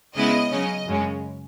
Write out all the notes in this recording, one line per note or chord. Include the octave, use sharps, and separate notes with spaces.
C#3 G#3 B3 E4 D#5
C#3 F#3 C#4 D#5
F#2 C#3 G#3 C#4